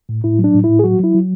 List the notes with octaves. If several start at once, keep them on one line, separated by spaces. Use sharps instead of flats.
A2
A2 E4
F#3
D4
A2
E4
A2
G#4
F#3 F#4
F#3 E4
F#3